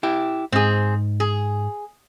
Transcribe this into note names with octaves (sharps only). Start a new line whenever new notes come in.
E4 G4
G#2 C4 G#4
G#4